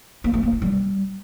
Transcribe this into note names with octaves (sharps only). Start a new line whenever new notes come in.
A#3
A3
A#3
E4
G3